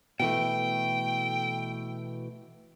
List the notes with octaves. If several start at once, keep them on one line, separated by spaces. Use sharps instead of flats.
B2 E3 A3 G5